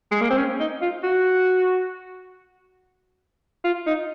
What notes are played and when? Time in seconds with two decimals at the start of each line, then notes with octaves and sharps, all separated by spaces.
0.12 G#3
0.21 A#3
0.30 C4
0.38 C#4
0.60 D#4
0.82 F4
1.03 F#4
3.65 F4
3.87 D#4